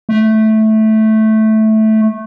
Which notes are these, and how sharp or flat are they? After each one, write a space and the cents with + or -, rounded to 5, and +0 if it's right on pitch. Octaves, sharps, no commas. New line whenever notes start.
A3 -10